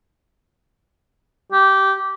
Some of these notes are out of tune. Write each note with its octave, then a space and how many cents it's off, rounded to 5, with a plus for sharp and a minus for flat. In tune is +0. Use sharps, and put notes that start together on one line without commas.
G4 -15